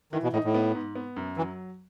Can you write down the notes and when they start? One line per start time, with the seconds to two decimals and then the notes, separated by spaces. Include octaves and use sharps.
0.13 D#3 E3
0.23 B2
0.33 A2 D#4
0.44 A2
0.54 B3
0.75 G#2
0.95 B3
1.16 F#2
1.37 E3 F#3